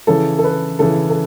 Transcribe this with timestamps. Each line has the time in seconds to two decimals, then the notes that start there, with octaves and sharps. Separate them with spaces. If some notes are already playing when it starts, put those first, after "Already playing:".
0.07 C#3 E3 A4
0.39 A4
0.44 B4
0.79 C#3 E3 A4
1.10 A4